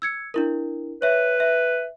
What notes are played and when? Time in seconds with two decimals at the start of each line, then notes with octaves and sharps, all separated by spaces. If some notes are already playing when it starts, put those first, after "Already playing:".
0.02 E6 G#6 C#7
0.34 D4 E4 A#4
1.02 B4 C#5 E5
1.40 E5